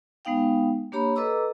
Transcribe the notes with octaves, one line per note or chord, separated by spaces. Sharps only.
G#3 B3 D#4 F5 G5
A#3 D4 G4 C#5 A#5 B5
A4 B4 D#5 A#5 D6 E6